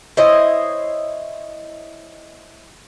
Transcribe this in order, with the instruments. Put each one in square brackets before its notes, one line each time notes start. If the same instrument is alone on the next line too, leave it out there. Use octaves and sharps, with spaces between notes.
[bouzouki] E4 C5 C#5 D#5